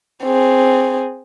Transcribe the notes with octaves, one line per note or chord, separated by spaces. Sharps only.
C4 G#4